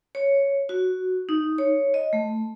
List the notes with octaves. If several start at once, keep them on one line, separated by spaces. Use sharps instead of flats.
C#5
F#4
D#4
C#5
D#5
A3